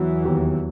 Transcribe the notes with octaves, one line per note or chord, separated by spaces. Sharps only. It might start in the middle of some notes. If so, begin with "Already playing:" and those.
Already playing: E2 E3 F#3
D#2